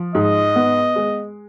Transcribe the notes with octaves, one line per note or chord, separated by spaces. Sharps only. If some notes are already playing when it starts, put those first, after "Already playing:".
Already playing: F3
G#2 D#5
B3
G#3